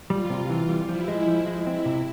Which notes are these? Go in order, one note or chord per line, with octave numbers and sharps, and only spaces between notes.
G3 F4
C3
E3
G3
F3 E4
G#3
F3
G#3
C4 E4
C3